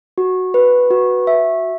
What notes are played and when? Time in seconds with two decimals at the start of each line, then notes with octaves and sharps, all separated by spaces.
0.18 F#4
0.54 B4
0.91 F#4
1.27 E5